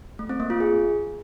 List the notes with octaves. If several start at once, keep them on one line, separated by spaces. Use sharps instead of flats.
A3
C4
A#3
F4
G#4